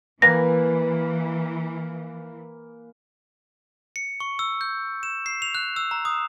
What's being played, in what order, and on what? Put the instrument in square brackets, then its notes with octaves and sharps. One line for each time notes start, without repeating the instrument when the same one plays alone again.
[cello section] E3 [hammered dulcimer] A#3 B4 G#5 [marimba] A#6
[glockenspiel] C#7
C#6
E6
G6
E7
C7
F7
F#6
E6
A#5
D#6